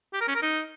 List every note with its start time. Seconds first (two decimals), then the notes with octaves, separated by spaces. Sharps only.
0.13 G4
0.21 A#4
0.28 C#4
0.35 A#4
0.43 D#4